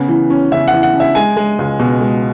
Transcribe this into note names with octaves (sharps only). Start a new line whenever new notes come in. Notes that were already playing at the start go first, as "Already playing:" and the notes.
Already playing: C#3 B3
E3
C#4
C#3 E5
F#5
E3
F#5
C#3
E5
G#3 G#5
G#3
C#2
B2
G#3